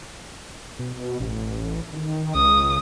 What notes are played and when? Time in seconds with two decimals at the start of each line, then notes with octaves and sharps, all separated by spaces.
0.79 B2
1.20 A1
1.93 D#3
2.35 C#2 D#6